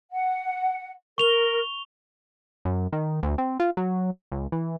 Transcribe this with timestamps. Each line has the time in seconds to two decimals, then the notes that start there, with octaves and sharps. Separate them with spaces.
0.11 F#5
1.18 A#4 C#6 F7 G7
2.65 F#2
2.92 D#3
3.23 D2
3.38 C4
3.60 F4
3.77 F#3
4.32 C#2
4.52 E3